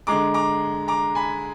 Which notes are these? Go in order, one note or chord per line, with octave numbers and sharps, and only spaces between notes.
D3 G#3 A#5 D6
A#5 D6
A#5 D6
G#5 B5